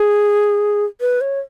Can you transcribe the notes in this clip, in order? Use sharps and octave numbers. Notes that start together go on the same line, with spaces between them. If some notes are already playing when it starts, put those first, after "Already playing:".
Already playing: G#4
B4
C#5